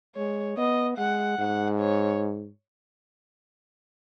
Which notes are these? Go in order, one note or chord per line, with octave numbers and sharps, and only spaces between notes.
G#3 C#5
B3 D#5
G#3 F#5
G#2 F#5
C#5